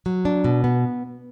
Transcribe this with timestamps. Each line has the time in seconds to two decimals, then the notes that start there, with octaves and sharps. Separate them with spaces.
0.06 F#3
0.25 D4
0.44 B2
0.64 B3